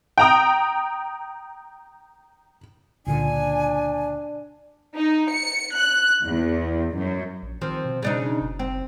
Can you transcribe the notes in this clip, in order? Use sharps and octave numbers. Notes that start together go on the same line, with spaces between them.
G5 A#5 D#6
C#2 A#2 D3 D4 G#5
D#4
C#7
F#6
E2
F#2
A#1
D#3 F3 C4
B2
C#3 D4 D#4
F#1
C4